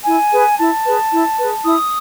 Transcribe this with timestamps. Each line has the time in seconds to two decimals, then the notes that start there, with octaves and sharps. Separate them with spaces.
0.04 E4 G#5
0.31 G#4 B4
0.58 E4 A5
0.84 G#4 B4
1.11 E4
1.37 G#4 B4
1.63 E4 D#6